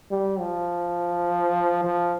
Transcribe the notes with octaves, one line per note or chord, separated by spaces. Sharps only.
G3
F3
F3